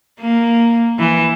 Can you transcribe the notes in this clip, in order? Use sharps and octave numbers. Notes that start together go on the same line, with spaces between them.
A#3
E3